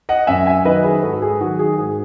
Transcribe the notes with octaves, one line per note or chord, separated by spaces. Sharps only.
D#5 F#5
F#2 E5 G#5
E5 G#5
D#3 F#3 B4 D#5
G#4 B4
G#2 F#4 A4
G#4
D#3 F#3 F#4
G#4
G#2 G#4